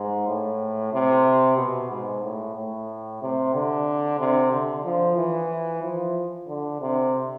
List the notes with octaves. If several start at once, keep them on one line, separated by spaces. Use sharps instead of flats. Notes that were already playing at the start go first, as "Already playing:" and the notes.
Already playing: G#2
A2
C3
B2
G#2
A2
A2
C3
D3
C3
D3
F3
E3
F3
D3
C3